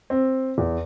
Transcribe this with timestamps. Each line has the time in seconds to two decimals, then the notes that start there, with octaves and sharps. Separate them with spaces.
0.10 C4
0.58 E2